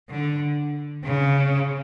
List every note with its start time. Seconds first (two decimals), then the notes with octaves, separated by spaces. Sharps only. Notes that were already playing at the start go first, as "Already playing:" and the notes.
0.10 D3
1.04 C#3